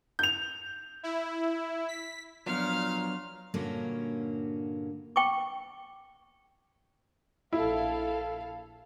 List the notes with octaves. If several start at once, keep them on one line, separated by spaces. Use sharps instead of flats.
G6 F7
E4
B6
A#2 F3 F#3 B3 D4 F5 F6
G2 A#2 D3 A#3 C#4 F#4
G5 C#6 D6
A#1 E4 A4 F5